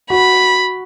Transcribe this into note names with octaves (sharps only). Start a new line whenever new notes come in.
F#4 B5